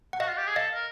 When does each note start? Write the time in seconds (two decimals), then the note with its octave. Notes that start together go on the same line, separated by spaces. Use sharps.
0.13 F#5
0.20 F#4 D#5 F5
0.29 F4
0.38 G4
0.47 G#4
0.56 A4 D#5 F5
0.74 A#4